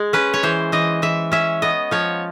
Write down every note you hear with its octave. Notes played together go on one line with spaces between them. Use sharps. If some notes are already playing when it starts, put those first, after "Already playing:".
Already playing: G#3
C#4 B4
C#5
E3 C5
E3 D#5
E3 E5
C#4 E5
B3 D#5
F3 C#5